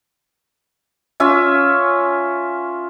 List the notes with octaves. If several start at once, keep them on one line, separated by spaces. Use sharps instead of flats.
C#4 F4 E5